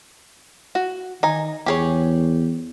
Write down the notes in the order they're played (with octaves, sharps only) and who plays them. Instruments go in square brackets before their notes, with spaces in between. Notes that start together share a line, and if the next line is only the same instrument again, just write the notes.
[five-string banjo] F#4
[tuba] D#3 [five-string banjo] D#4 G#5
[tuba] E2 [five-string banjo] G4 G#4 C#5